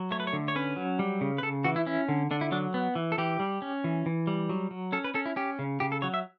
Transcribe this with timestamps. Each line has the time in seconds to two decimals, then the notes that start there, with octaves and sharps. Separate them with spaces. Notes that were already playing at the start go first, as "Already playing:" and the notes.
Already playing: F#3
0.11 A3 C#5
0.20 B4
0.27 C#5
0.33 D3
0.48 C#5
0.56 C#4 B4
0.76 F#3
0.99 G3
1.21 C#3
1.38 B4
1.42 C#3 A4
1.64 E3 F#4
1.76 E4
1.86 C#4 E4
2.08 D3
2.31 D3 D4
2.41 E4
2.52 F#3 D4
2.74 B3
2.95 E3
3.12 A4
3.18 E3 G4
3.40 G3
3.62 C#4
3.84 E3
4.06 E3
4.27 G3
4.49 F#3
4.71 F#3
4.92 C#4 A4
5.04 B4
5.14 C#4 A4
5.26 E4
5.36 C#4 G4
5.59 C#3
5.80 C#3 G4
5.92 A4
6.02 F#3 C#5
6.14 E5